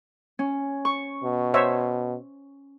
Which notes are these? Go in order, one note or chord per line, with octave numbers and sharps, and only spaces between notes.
C#4
C#6
B2
C5 C#5 E5